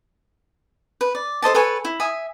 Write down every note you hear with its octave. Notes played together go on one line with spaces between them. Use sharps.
B4
D5
A4 C5 D#5 A5
A4 B4 C#5 G#5
E4
E5 G#5 D#6